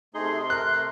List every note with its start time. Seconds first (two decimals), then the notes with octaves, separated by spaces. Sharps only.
0.14 C3 A3 D#4 G#4 C6
0.50 A#4 F#6